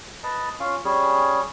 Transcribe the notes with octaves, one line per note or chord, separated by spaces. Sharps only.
B4 D#5 A5
C#4 F4 F5
G3 C#4 G#4